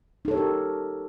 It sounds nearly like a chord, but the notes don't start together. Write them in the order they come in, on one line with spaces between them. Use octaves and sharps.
D#4 A4 C#5 G4 A#4